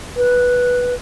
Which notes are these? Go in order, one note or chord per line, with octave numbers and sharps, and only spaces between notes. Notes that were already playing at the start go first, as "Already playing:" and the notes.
B4